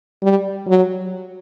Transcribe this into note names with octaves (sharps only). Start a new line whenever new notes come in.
G3
F#3